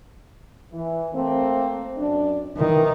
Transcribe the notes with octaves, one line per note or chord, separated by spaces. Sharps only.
E3
A3 A#3 C4
F#2 D4
D#3 E3